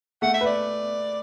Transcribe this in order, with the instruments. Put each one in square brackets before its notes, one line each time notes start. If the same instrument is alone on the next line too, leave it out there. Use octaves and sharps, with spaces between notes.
[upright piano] A3 [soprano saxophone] F#5
[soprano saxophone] E5
[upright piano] B4 [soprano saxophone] D5